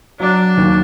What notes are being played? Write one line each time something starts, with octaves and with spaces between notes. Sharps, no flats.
F#3 D4
D#2